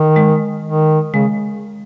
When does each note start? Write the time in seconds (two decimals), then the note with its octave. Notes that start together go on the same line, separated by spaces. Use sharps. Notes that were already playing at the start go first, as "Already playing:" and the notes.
Already playing: D#3
0.16 G#3
0.65 D#3
1.14 C#3 G#3